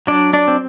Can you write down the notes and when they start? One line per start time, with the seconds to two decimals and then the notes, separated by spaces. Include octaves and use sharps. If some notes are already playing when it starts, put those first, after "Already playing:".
0.07 F#3 D4 D5
0.33 D4 D5
0.48 C4